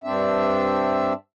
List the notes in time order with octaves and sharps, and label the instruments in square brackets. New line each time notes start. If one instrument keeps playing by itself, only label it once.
[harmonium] G2 C4 D4 E5